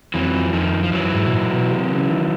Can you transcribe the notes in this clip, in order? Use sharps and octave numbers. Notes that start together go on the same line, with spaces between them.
F2 E3 F#3
F2
F2 D#3 F3
F#2
F3
F#2 E3 F#3
G#2
B2
A#2
B2
C3
C#3
D#3